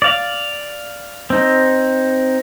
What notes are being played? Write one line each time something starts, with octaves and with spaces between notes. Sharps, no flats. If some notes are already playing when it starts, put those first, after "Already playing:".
D5 F5
C4 D#4